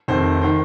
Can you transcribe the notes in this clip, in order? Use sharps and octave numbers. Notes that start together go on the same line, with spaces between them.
F1 F2 D#3 C5
D#3 C5